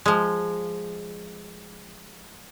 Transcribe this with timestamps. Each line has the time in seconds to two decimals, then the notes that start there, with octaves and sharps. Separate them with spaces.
0.06 F3 G#3